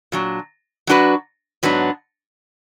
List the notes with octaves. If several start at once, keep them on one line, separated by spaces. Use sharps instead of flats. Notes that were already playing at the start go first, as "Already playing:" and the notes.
A#2 F#3 D4
F#3 D4 F#4 B4
G#2 F#3 B3 D4